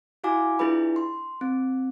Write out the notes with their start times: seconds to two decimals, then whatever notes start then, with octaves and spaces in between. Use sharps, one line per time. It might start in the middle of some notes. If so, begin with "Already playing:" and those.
0.24 E4 F#4 F5 G#5 D6
0.59 D4 E4 F4 G#4 B4 B5
0.96 C6
1.41 C4